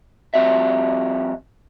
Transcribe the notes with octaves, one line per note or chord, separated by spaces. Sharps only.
F3 G3 C4 F#4 E5